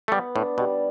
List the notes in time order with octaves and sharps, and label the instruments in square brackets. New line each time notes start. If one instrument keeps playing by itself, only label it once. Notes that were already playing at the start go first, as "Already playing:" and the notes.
[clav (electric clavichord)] A3
[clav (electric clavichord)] G3 [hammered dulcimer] B3
[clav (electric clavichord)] A2 [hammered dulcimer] D4
[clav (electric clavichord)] B2 [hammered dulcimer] G3